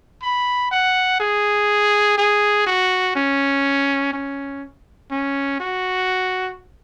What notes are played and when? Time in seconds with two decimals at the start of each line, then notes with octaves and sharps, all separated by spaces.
0.22 B5
0.71 F#5
1.20 G#4
2.18 G#4
2.66 F#4
3.15 C#4
4.13 C#4
5.11 C#4
5.60 F#4